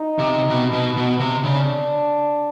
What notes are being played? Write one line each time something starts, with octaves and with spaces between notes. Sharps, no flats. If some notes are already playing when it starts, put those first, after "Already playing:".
Already playing: D#4
C3
B2
B2
B2
C3
C#3 D4